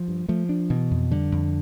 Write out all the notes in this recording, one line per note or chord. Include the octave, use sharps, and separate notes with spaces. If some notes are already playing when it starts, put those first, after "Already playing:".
Already playing: F3
G2
F3 A3
D4
B2 E3
F2
D3 G3
F2